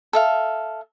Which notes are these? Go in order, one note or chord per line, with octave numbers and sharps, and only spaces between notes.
A4 E5 F5